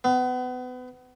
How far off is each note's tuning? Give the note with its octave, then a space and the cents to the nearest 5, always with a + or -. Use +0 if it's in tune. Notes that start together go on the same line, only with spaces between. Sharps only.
B3 +30